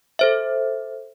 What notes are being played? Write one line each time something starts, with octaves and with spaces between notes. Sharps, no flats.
A4 C5 E5